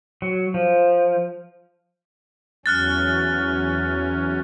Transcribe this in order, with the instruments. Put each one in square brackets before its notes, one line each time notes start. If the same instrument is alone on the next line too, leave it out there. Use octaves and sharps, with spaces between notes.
[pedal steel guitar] F#3
F3
[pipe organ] E2 F#3 C#4 [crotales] F6 F#6 A6